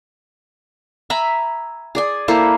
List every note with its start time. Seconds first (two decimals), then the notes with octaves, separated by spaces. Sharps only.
1.10 E5 G#5 A#5 B5
1.95 G#4 D5 G#5
2.28 A#3 E4 A4 C5